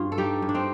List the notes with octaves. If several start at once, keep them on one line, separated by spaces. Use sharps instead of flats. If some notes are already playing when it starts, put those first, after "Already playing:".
Already playing: G2 F4
A4
G3 D#4 G4
G2
D4
C4 D#4